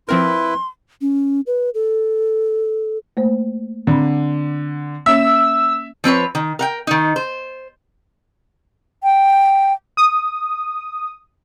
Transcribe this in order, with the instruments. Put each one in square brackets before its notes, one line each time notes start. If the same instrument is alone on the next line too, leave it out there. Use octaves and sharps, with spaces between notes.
[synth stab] F3 C4 A#4 [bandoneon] E4 B4 [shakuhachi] C6
[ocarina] C#4
B4
A4
[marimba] A3 A#3 C5
[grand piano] D3 [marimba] C4 B5
[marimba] A#3 C#4 C#5 [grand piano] E5 [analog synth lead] E6
[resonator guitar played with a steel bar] F3 C4 B4 C#5
D#3
A#4 F#5 G5
D#3 D#4
C5
[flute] G5
[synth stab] D#6